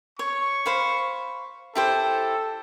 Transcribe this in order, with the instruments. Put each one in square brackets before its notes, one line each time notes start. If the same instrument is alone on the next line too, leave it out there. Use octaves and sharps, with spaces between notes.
[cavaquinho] C#5 [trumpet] C#6
[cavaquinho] C5 F5 B5
[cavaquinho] E4 G4 C5 [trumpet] A4